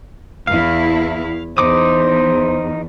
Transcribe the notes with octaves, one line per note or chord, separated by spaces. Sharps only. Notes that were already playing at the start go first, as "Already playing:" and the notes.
E2 E4 F5
E2 D#4 C5 D6 D#6